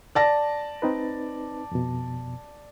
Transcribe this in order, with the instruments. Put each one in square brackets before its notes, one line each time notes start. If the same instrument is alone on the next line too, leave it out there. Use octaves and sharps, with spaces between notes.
[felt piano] D5 A5 A#6
[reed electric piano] C4 D#4 B4
F2 B2